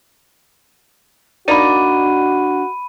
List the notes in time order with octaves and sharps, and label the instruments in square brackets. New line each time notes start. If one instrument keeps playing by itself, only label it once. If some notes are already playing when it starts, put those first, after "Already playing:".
[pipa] A#3 D#4 D5 [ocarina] D4 [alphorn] F#4 [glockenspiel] B5 D#7